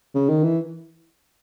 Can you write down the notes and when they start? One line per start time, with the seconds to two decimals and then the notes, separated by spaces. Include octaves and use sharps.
0.15 C#3
0.29 D#3
0.43 E3